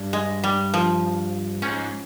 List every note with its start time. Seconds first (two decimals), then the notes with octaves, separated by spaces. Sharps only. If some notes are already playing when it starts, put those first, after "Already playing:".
Already playing: G2
0.13 G#3
0.44 G3
0.74 F3
1.62 G#2 C#4